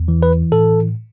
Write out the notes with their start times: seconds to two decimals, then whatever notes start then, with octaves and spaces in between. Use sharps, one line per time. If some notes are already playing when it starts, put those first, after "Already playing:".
Already playing: E2
0.08 E3
0.23 B4
0.52 A2 A4